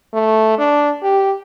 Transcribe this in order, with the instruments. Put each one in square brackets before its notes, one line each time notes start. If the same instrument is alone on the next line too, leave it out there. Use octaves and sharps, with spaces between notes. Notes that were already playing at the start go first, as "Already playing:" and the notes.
[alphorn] A3
D4
G4